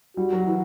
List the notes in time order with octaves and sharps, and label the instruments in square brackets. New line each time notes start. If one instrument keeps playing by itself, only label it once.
[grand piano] G3 [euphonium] F#4
[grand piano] F#3
E3